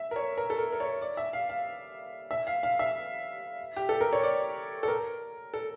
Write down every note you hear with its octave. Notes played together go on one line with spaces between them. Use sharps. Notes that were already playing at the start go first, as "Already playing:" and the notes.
Already playing: E5
A#4
C#5
A#4
A4
A#4
A#4
C#5
D5
E5
F5
F5
E5
F5
F5
E5
G4
A4
A#4
C#5
D5
A4
A#4
A4